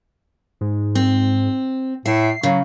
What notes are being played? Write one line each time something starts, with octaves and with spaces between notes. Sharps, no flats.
G#2
C4
A2 E5 C7
C#3 F#3